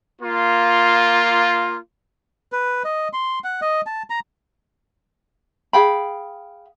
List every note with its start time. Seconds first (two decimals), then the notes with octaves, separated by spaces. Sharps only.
0.21 A#3 F4
2.52 B4
2.85 D#5
3.13 C6
3.44 F#5
3.62 D#5
3.86 A5
4.10 A#5
5.73 G#4 F5 G5 B5